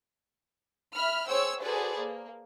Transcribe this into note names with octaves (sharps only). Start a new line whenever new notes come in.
E5 B5 F6
G#4 C5 C#5 G5 E6
F#4 G#4 A4 B4 C5 D5
A#3